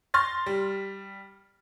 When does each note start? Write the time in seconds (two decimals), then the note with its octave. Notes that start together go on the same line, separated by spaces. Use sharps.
0.14 C6 F6 A6 A#6
0.46 G3